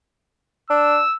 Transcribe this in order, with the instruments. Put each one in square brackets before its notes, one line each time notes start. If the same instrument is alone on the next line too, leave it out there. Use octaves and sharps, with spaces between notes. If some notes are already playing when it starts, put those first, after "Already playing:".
[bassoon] D4 [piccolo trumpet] E6